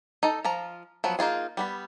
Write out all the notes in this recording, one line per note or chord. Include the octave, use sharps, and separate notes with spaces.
D#4 A4
F3 F4 A#5
F3 F#3 B3
A#3 D#4 F4 G#4
G3 B3 B5